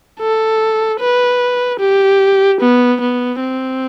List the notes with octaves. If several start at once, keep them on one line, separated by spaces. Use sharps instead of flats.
A4
B4
G4
B3
B3
C4